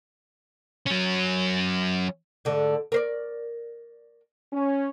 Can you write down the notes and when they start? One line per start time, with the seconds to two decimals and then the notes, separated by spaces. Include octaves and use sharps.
0.87 F#3 C#4
2.45 G#2 D3 A3
2.92 A#4 C5 D5
4.52 C#4